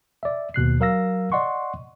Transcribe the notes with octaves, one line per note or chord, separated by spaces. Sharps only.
D5 E5
D#2 B2 F#6 C7
F#3 A#4 F5 E6 A#6
D5 D#5 F#5 C6 C#6